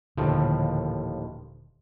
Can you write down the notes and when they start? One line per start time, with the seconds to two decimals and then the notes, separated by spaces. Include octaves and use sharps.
0.17 D#1 D#2 A2 D3 F3